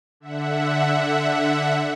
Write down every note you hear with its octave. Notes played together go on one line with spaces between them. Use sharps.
D3 E5 F#5